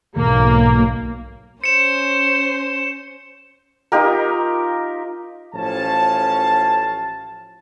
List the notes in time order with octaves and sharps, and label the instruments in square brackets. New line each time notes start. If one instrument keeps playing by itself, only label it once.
[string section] B1 A#3 [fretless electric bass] G#2 B2 E3
[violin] C#4 C5 [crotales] C#7 E7
[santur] D#4 F4 G4 A#4
[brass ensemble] A1 F3 C#4 F5 A5